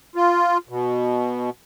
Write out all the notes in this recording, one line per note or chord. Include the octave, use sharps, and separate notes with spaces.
F4
B2